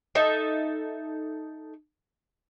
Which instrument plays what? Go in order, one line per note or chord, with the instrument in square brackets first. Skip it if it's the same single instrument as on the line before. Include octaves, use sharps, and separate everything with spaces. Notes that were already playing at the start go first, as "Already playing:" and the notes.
[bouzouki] D#4 A4 E5